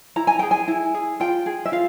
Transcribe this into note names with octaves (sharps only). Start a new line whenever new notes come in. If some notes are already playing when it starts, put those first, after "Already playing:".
E4 A#5
G#5
G#4 G5
G#5
E4
G#4
F4 G5
G#4
E5
F4 F5